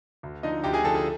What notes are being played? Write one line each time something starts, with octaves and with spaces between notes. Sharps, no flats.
D2
D3 F3 D#4 D#5
D2 G4 G5
G#4 G#5
D3 F3 A4 A5
G#4 G#5